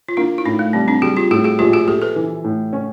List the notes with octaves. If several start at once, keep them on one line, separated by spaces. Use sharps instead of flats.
F4
A#3 D4 E4
E4
A2 C#4 D#4
A3
G3 C4
C4 D4
G3 F#4 G#4
F4 G4
A2 F#4 G#4
F#4 G#4
A#1 F4 G4
F#4 G#4
A#1 G4 A4
A4 B4
E3
A2
C#4